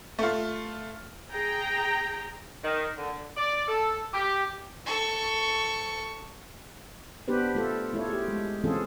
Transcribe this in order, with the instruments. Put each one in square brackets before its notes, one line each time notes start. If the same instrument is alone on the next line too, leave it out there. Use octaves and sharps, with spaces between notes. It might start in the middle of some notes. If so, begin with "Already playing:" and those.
[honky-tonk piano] A3 F4
[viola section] G#4 G5 A#5
[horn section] D#3
D3
D5
A4
G4
[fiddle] A4 C#6
[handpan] B3 D4 G4 B4 C5
A3 F4 A4
A3 E4 F4 A4 C#5
G4 G#4
G#3
E3 C4 C#4 F4 G#4 A4